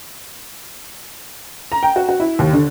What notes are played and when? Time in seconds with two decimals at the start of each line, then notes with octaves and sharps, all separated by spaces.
1.72 A#5
1.83 G5
1.96 F#4
2.09 F#4
2.20 E4
2.39 D#2
2.53 D3